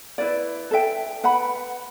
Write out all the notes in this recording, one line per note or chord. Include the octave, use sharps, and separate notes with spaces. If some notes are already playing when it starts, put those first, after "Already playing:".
E4 B4 D5
A4 E5 G5
B4 F#5 B5